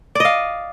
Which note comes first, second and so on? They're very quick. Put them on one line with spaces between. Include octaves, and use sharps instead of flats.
D5 D#5 F5